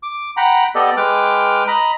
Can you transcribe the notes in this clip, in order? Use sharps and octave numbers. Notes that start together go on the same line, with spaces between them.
D6
F#5 G5 A#5 B5
B3 G4 A4 D5 D#5
G#3 B4 G5 D6 F6
D#5 A#5 B5